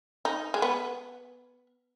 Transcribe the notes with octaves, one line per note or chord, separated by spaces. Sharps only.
D#4
G#3
B3